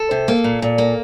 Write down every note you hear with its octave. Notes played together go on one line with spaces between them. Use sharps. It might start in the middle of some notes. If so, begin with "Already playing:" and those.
Already playing: A4
C3
A#3
A#2
A#2
A#3